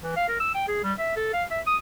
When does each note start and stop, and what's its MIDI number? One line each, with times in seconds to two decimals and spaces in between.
0.04 0.15 52
0.17 0.26 77
0.28 0.37 70
0.40 0.52 88
0.55 0.64 79
0.68 0.79 68
0.84 0.93 55
0.99 1.13 76
1.16 1.33 69
1.33 1.44 77
1.51 1.61 76
1.66 1.77 87